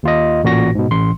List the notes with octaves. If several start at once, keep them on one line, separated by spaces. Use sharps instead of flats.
D#2 F4 D#5
A1 A#2 F#4 A#6
G#2 B2
A1 C6